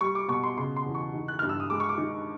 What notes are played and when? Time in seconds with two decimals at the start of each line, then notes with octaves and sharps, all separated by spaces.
0.01 G3 C#6
0.15 D6
0.28 B2 C#6
0.43 C6
0.57 C#3 C6
0.76 C6
0.86 E2
0.95 C#6
1.14 D#3
1.28 F#6
1.39 G2 F6
1.49 E6
1.60 D#6
1.70 G#3 D6
1.80 C#6
1.89 D6
1.98 D#3